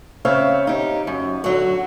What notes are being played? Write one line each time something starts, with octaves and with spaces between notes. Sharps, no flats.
C#3 C4 C5 C#5 E5 F5
D#4 G4
F#2
D3 F#3 F#4